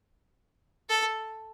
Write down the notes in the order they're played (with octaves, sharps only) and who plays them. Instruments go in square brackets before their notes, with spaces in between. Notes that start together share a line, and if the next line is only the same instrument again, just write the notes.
[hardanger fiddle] A4